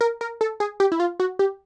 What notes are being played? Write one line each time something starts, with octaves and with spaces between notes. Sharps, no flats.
A#4
A#4
A4
G#4
G4
E4
F4
F#4
G4